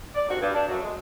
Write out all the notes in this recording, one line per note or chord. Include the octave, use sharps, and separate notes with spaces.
D5
A#2 D#3 G3 C4 D4 F#4
G2
D4
F#2 F#3
G#3